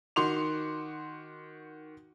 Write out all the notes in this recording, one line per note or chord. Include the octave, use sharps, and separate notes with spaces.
D#3 F#4 C6 D6 F7